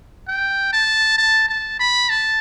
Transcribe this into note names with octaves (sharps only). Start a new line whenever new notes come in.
G5
A5
A5
A5
B5
A5